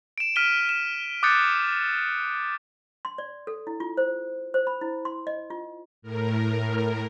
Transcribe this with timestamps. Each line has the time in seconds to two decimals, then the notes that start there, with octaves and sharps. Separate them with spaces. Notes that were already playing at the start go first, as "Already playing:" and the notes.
0.18 D7 E7
0.36 F6 B6 D7 D#7 G7
0.69 E7
1.23 D6 D#6 F#6 G6 A6 C#7
3.05 C6
3.18 D5
3.47 A4
3.67 E4
3.80 F4
3.97 C5
4.54 C5
4.67 B5
4.81 E4
5.05 C6
5.27 D#5
5.50 F4
6.02 A2 A#4